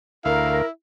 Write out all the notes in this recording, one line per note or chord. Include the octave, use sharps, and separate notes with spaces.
D2 E4 A#4 F5